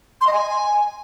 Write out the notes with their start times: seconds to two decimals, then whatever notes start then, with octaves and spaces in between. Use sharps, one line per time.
0.21 C6
0.27 D#5
0.33 G#5